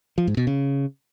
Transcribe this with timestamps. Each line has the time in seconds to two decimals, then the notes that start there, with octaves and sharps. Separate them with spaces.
0.18 F3
0.27 G#2
0.37 B2
0.47 C#3